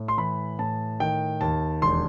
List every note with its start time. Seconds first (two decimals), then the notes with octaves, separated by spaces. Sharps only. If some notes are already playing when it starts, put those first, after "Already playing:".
Already playing: A2
0.08 C6
0.17 E3 B5
0.59 A2 A5
1.00 D#3 G5
1.41 D#2 A5
1.82 E1 C6